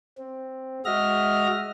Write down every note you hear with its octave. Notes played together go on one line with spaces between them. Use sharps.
C4
G#3 F#4 D#5 E5 F6 A#6